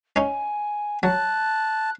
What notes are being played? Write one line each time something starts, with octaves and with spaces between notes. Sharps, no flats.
C#4 D#4 G#5
F#3 A5 F#6